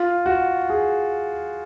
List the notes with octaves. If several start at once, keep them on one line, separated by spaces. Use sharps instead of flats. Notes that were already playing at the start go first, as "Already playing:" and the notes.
Already playing: F4
F#4
G#4